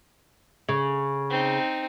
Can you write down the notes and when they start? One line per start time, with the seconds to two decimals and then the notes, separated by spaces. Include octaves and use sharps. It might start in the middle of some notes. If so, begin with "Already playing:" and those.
0.69 C#3
1.30 C4 D#4